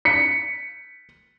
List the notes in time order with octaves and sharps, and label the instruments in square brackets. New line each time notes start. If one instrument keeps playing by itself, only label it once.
[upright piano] B6 C#7